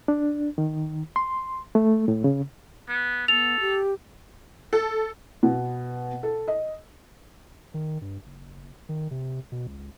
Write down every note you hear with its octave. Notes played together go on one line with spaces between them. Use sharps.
D4
D#3
C6
A3
A2
C#3
B3
B3 A4 F7
G4
A4
B2
A4
D#5
D#3
G2
F#1
D#3
C3
B2
C#2